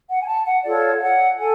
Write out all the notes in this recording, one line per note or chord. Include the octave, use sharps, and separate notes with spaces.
F#5
G#5
A5
F#5
F4 A4 C#5 D5
F5
F#5
A4 G#5